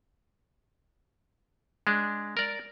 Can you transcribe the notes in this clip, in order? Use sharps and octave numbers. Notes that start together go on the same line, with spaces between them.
G#3 D4
A#4 D5